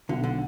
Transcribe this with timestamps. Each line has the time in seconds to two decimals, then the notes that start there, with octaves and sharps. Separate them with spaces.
0.09 B1 D3
0.24 D3